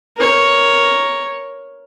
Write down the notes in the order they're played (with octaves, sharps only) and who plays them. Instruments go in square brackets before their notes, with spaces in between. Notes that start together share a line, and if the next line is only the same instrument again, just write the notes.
[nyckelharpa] A#4 C#5